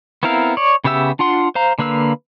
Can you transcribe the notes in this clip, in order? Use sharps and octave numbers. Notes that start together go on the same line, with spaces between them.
B3 C4 E4 A#4 F5
C#5 D5
C#3 B3 G4 E5 E6
D4 F4 F#5 C6
C5 F5 A#5
D3 A#3 B4 F5 E6